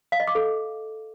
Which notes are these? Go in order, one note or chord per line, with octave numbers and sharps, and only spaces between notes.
F5
D#5
D6
A4